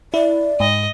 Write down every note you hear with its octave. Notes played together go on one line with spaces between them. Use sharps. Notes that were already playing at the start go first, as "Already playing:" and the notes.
E4 D5
G#2 D#5